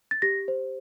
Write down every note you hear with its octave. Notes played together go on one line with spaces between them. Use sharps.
A6
G4 A#6
C5